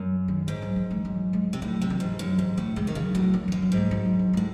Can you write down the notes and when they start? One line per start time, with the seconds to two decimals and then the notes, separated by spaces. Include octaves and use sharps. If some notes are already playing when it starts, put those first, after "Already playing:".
Already playing: F#2
0.28 D#3
0.47 G#2 E3
0.62 F#3
0.76 E3
0.91 G#3
1.05 F#3
1.33 G#3
1.53 C3
1.62 A2 F#3
1.81 C3
1.90 E3
2.00 G#2
2.19 F#2
2.38 G#2 D#3
2.57 A2 E3
2.76 C3 G#3
2.87 D#3
2.95 C#3 F#3
3.14 A2 F#3
3.34 F#3
3.48 F#2 E3
3.62 F#3
3.72 G#2
3.77 G#3
3.91 F#3
4.06 F#3
4.19 F#3
4.33 A2 G#3